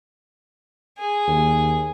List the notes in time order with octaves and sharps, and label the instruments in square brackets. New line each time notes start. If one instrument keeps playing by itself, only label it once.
[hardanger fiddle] G#4
[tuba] D#2